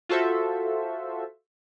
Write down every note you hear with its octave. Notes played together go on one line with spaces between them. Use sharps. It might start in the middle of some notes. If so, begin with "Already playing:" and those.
F4 F#4 A4 C5 E5